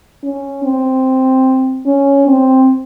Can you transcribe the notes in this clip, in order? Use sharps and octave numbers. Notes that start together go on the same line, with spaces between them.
C#4
C4
C#4
C4